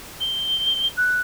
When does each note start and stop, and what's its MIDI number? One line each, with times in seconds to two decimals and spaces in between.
0.20 0.87 103
0.97 1.21 90